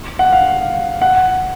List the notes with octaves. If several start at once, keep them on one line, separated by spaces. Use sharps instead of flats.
F#5
F5
F#5